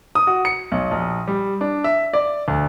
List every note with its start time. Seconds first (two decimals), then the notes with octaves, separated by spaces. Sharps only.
0.15 D#6
0.27 F#4
0.45 C#7
0.72 B1
0.91 A#1
1.28 G3
1.61 D4
1.84 E5
2.13 D5
2.48 D2